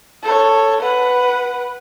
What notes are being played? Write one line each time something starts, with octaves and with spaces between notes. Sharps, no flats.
A4 C#5
B4 F#5